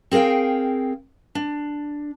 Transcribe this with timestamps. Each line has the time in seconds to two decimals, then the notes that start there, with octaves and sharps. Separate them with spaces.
0.11 C4 G#4 A#4 F5 G5
1.35 D4